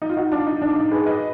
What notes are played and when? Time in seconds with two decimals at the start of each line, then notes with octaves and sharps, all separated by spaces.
0.02 D#4
0.09 F4
0.17 D#4 F#4
0.32 D4 F4
0.46 D#4
0.62 D4
0.76 D#4
0.91 G#4 B4
1.06 B4 D#5